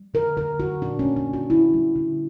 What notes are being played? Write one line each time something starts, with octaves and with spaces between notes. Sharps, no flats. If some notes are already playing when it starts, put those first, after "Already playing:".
Already playing: G3
D3 A#4
D3 A#4
D3 F#4
A#2 D4
C#4
A#3
D4
A#2
F#4
D3 E4
G3
D3